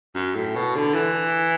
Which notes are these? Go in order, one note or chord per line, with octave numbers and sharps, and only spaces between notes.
F#2
A2
B2
D3
E3